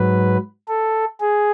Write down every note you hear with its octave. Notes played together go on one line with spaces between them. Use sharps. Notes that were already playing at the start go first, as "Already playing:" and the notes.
Already playing: G#2 F#3 B4
A4
G#4